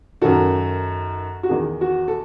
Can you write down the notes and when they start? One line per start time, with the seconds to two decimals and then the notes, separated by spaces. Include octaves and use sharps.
0.21 F#2 D#3 F#4 A4
1.43 F#4
1.49 E2 D#3 G#4
1.81 F#4
2.08 A4